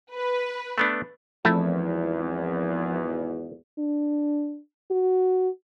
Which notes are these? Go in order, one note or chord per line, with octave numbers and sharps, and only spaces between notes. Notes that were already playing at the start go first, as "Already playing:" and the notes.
B4
A3 B3 D4
G#1 E2 F3 A3 C4 E4
D4
F#4